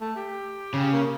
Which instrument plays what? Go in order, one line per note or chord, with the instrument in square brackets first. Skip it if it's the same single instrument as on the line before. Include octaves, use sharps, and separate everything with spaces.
[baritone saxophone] A3
G4
[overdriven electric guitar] C#3
[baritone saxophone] A#3